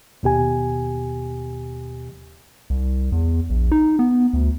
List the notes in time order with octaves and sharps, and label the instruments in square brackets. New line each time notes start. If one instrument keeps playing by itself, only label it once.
[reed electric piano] D#2 B2 G4 G#5
[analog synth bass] C2
E2
A#1
D#4
B3
D2